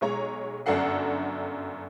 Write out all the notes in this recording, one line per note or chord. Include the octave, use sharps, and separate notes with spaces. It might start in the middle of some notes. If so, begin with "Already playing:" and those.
B1 G#3 C#5 A#5
G1 F#2 D4 A4 F#5 C7